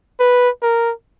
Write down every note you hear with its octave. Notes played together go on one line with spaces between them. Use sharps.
B4
A#4